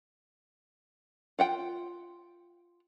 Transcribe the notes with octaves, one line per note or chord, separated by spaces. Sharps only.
F4 F#5 G5